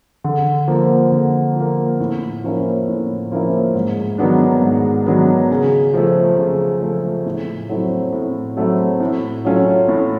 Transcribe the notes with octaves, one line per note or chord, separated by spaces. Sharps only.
D3
F3 A#3
D3
F3 A#3
A2
F3 A#3 C#4 E4
A2
F3 A#3 C#4 E4
G#2
D#3 F#3 B3 D4
G#2
D#3 F#3 B3 D4
C#3
F3 A3
C#3
F3 A3
A2
F#3 A3 C4 E4
A2
F#3 A3 C4 E4
A2
F#3 A3 C#4 F4
A2